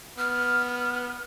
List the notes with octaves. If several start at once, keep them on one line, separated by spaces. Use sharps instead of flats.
B3 F6